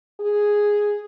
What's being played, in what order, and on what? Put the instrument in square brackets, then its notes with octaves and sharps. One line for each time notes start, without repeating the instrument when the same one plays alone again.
[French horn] G#4